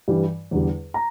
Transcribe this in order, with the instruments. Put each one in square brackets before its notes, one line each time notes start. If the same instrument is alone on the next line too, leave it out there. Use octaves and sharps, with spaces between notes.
[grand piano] G2 E3 G3
E2 D3 G3
A#5